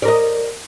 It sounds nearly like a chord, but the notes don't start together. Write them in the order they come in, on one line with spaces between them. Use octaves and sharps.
D5 A#4 D#5